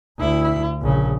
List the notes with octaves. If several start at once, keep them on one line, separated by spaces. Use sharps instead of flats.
D2 E4
A#1 C#3